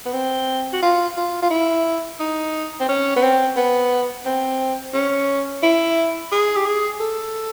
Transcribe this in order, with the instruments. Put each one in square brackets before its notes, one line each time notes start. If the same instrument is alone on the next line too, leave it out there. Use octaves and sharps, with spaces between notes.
[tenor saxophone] B3
C4
F#4
F4
F4
F4
E4
D#4
C4
C#4
B3
C4
B3
C4
C#4
E4
G#4
G4
G#4
A4